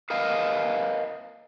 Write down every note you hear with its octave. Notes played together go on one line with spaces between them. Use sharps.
A#4 B4 D#5 F5